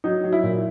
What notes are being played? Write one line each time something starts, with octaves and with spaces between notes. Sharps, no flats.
F#3 D#4
F#3
E4
A#2